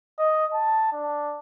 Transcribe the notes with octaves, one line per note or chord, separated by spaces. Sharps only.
D#5
A5
D4